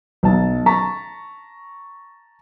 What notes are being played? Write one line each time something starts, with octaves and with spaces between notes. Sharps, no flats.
B1 A5
A5 A#5 C#6 B6